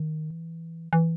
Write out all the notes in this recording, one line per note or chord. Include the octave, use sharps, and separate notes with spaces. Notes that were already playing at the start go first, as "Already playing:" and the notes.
Already playing: D#3
E3
E3